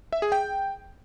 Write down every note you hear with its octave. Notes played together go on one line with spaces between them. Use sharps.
E5
G#4
G5